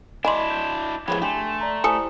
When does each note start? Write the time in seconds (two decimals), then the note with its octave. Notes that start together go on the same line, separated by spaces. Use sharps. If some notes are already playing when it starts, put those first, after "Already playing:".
0.25 D4 E4 D#5 G#5 B5 C6
0.50 G6
1.08 F3 G#3 B3 E4 G4 C#5 B5
1.22 A3 D4 G4 G#5 C6
1.61 D5 A#5
1.84 E4 G4 A4 C5 G#5 D#6 C#7